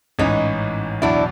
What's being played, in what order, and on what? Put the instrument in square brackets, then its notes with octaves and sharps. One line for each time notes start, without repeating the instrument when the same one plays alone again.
[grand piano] A1 G#2 E3 [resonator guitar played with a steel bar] C#4 D#4
[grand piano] E2 B2 F#3 [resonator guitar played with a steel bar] D4 E4